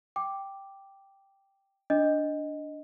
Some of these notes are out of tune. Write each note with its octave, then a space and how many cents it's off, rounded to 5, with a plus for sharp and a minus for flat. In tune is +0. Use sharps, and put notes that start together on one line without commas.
G5 +0 D6 +0
D4 -5 D#5 +0